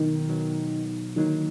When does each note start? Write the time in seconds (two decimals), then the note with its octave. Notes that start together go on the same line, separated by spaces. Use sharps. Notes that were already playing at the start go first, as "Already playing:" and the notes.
Already playing: B2 D#3 F#3 B3 D#4
0.28 B2 F#3 B3 D#4
1.16 D3 D#3 F#3 A#3 D#4